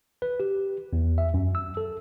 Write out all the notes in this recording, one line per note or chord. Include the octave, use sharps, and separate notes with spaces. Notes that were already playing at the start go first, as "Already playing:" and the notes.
B4
G4
E2
E5
F#2
E6
A4